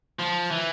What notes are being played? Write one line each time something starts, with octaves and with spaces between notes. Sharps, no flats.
F3
E3